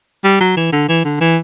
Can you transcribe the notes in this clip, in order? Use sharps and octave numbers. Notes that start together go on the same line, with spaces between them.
G3
F#3
E3
D3
E3
D3
E3